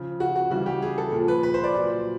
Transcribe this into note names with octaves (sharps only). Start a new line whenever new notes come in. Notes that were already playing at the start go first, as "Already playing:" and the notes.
Already playing: C#3 F3
F#4
F#4
C#3 E3 G3 F#4
G4
G#4
A4
A#2
F3
B4
B4
C5
D5
A#2 F#3